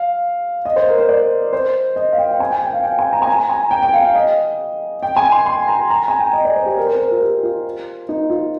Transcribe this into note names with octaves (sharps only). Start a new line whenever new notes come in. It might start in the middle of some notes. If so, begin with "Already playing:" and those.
Already playing: F5
D#5
C5
A#4
C5
D5
C5
D#5
F5
G5
G5
G#5
G5
G5
F5
G5
G#5
A#5
G#5
A#5
G#5
G5
G5
F5
F5
D#5
G5
G#5
C6
C6
A#5
A#5
G#5
G5
D#5
D5
C5
G4
A#4
C5
A#4
F4
G4
F4
D#4
F4